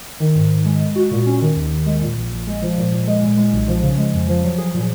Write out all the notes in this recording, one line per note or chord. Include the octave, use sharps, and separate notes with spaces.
D#3
G#2
G#2
G#3
G#3
F#4
A#2
C#4
D#3
D#2
D#2
G#3
A#2
A#1
A#1
G#3
F3
A#2
A#2
G#3
A#2
G#3
B1
F3
C#3
G#3
F2
F3
F#3
G#4
A#2